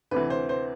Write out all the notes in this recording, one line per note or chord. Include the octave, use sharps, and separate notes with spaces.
D2 C3 E3 B4
C5
C5